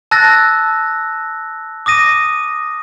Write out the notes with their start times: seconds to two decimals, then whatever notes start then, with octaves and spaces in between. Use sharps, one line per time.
0.11 A5 E6 F#6 A6 A#6
1.86 D6 D#6 A#6 D#7